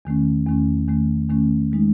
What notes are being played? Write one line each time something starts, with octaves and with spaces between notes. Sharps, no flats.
E2 D#3 A3 C#4
E2 D#3 A3 C#4
E2 D#3 A3 C#4
E2 D#3 A3 C#4
D#3 G#3 D#4